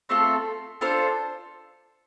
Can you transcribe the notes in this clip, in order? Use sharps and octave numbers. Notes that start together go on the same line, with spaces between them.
A3 C4 F4 A4
D4 F4 A4 C5